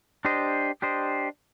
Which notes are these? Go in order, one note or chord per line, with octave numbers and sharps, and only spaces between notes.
D4 G4 C5 D#5
D4 G4 C5 D#5